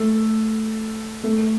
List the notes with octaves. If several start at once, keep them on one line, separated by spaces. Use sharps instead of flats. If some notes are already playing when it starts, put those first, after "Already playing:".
Already playing: A3 A4
A3 A4